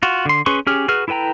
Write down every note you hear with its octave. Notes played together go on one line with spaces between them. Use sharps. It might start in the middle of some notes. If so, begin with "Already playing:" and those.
F4 F#4
D3 C6
C#4 G#4 B4 C6 C#6
C#4 G4 G#4 F6
F#4 G#4 B4 F6
E4 A4 B4 G5 A#5